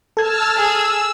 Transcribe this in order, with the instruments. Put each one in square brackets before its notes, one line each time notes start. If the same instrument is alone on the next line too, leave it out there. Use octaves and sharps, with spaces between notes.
[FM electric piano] A4 G#6 [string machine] A5 E6 F6
[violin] G#4 [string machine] E6